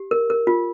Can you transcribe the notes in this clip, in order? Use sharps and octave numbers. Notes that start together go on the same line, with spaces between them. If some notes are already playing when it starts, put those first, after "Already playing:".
Already playing: G4
A#4
A#4
F4